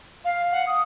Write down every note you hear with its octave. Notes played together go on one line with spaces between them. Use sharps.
F5
F#5
D#6